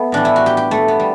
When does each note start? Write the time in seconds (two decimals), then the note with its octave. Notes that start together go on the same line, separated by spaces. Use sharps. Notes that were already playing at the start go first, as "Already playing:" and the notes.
Already playing: A3 B3
0.12 A2 E3 G3 D4
0.25 E4
0.36 F#4
0.46 G4
0.57 G4
0.71 A3
0.88 B3
1.00 G3